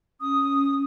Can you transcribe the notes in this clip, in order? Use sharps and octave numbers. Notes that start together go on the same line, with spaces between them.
C#4 D#6